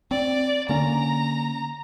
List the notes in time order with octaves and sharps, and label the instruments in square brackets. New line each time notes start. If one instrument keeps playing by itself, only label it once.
[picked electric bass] C4 [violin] D5
[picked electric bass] D3 A#3 C#4 [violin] A#5